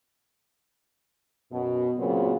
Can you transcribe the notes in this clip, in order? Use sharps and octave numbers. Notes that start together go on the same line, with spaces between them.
F#2 B2
F#2 A#2 C#3 F#3 B3 C4